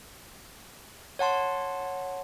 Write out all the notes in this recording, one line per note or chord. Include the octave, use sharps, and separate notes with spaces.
C#5 F#5 A5 C6